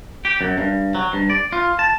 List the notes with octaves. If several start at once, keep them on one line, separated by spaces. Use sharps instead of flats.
G4
F#2
G2
F#3
G2
D5
F4
A5